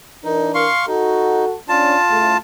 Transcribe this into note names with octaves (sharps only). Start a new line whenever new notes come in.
E3 D4 D#4 A#4
F5 C6 C#6
D#4 F#4 A4
C#4 D4 F4 A5
A2 C#3 A3